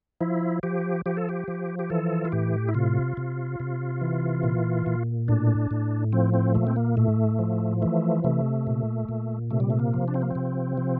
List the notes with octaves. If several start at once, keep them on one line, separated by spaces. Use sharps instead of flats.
F3 E4
F3 G4
F3 G4
A4
G4
F3
G4
E3 A4
F4
A2 G4
E4
C3 F4
C3
C3
E3
A#2
A#2
A2 D4
A2
F3 C4
C4
A#2 A3
C4
A#3
A2 A3
F3
E3 A3
C3 A3
A#2
A#2
C3 A3
G3
A3
A#3
F3
D4
C4
A#3
C3 C4
F3